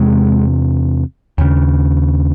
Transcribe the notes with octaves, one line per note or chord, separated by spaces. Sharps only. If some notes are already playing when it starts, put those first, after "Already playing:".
Already playing: E2 C3 G#3
D#2 C#3